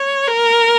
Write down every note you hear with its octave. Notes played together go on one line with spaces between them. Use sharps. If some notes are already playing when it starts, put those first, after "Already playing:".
Already playing: C#5
A#4